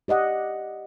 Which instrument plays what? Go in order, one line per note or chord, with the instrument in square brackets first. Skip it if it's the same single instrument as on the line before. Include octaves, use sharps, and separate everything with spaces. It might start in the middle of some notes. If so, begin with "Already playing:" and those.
[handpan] G4 D5 D#5 F#5